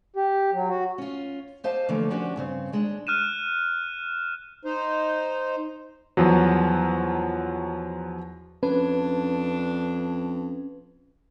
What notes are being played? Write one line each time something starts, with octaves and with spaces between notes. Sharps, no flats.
G4
F#3
F#4
C#4 F4
G4 C5 D#5 F5 A5
D3 E3 F3 A3 A#3
F3 B3 C#4 D4 F#4 G4
G2 C#3 C4
D#2 G#3 D4
F6 F#6 D#7 E7
D#4 C5
E2 F3 F#3
F2 C#4 D4 B4